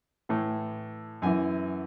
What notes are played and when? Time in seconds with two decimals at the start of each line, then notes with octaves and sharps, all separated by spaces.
0.29 A2 E3
1.22 F#2 E3 G#5